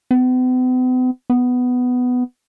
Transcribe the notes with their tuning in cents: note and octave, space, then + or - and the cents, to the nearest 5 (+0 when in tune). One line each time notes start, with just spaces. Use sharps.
B3 +45
B3 +10